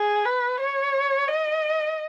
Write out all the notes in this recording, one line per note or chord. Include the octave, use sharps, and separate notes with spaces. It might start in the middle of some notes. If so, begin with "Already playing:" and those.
Already playing: G#4
B4
C#5
D#5